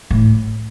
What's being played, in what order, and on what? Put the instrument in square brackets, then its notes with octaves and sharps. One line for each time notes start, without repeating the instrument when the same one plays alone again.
[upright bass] A2